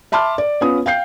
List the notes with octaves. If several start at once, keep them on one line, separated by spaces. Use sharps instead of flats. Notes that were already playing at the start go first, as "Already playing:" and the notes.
E5 A5 B5 C6 D6 F6
D5
B3 C#4 F4 D#6
F5 G5 G6 C7